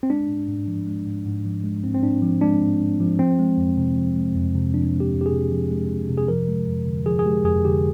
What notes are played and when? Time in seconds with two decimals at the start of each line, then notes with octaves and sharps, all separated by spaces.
0.03 C4
0.10 G#3 D4
0.29 G#2
0.48 G#2
0.68 F3
0.87 G#3
1.06 G#2
1.26 G#2
1.45 F3
1.64 G#3
1.84 G#2 C4
1.95 C4
2.03 G#2 D4
2.22 F3
2.41 G#3 D4
2.61 G#2
2.80 G#2
3.00 F3
3.19 F3 C4
3.39 G#3
3.57 F2
3.77 C3
3.97 F3
4.16 G#3
4.35 F2
4.55 C3
4.74 F3 D4
4.94 G#3
5.00 G4
5.13 F2
5.21 G4
5.26 G#4
5.32 C3
5.52 F3
5.71 G#3
5.91 F2
6.10 C3
6.18 G#4
6.28 F3 A#4
6.48 G#3
6.68 F2
6.87 D3
7.06 F3 G#4
7.19 G#4
7.26 G#3 G4
7.45 F2 G#4
7.64 D3 G4